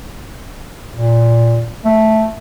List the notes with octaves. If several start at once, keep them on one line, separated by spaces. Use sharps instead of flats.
A#2
A3